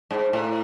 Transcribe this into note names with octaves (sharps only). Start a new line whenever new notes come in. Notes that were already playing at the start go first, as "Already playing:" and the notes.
G#2
A2